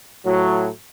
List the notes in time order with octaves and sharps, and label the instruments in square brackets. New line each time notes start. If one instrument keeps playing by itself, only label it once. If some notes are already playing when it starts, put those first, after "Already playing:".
[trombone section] A2 F#3